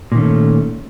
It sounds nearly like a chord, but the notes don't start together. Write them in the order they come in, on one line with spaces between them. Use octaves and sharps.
A#2 D#3 C#4 A3